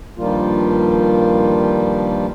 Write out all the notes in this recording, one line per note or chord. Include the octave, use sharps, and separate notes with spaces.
G2 D#3 F3 G3 A#3 F4